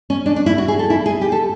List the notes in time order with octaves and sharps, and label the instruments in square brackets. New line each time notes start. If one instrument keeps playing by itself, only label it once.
[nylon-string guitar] C#4
D4
D4
E4
F#4
G#4
A4
E4
G#4
G4
A4